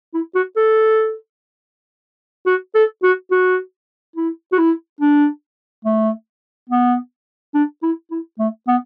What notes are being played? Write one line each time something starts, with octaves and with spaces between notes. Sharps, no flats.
E4
F#4
A4
F#4
A4
F#4
F#4
E4
F#4
E4
D4
A3
B3
D4
E4
E4
A3
B3